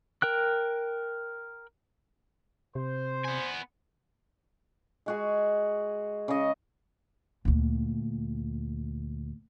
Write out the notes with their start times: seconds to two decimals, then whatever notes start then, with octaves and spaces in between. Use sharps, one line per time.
0.22 A#4 G5 F#6
2.75 C3 C5
3.25 B3 G#5
5.06 G#3 F#4 G#4
6.28 C#3 D#5
7.45 D2 A#2